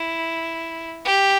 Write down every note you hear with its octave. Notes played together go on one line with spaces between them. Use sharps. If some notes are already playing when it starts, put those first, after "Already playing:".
Already playing: E4
G4